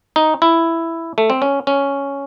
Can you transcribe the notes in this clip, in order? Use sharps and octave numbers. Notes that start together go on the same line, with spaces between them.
D#4
E4
A3
C4
C#4
C#4